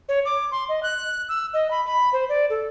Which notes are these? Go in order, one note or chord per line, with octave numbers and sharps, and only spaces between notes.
C#5
D6
C6
D#5
F#6
E6
D#5
B5
B5
C5
D5
A4